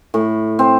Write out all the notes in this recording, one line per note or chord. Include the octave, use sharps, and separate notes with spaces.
A2
C4